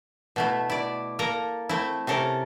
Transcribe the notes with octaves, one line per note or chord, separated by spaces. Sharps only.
B2 A3 E4
E4 D5
A#3 A4 A#4 A#5
A3 C4 E4
C3 C#4 A4 A#4